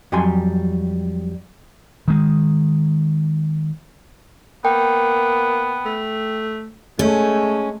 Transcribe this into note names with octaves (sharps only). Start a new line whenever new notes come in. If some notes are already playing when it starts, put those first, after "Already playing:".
F2 F#3 G3 G4 G#5 C6
D#3 G#3
A#3 B3 G5
A3
G#3 A3 C#4